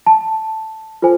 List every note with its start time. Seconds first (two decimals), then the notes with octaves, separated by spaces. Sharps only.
0.06 A5
1.02 F4 A4 C5 G#5